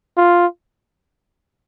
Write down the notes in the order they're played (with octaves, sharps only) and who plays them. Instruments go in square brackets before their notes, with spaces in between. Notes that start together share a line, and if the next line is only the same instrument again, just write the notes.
[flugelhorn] F4